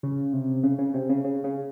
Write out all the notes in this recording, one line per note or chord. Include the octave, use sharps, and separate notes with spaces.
C#3
C3
C#3
C#3
C3
C#3
C#3
C#3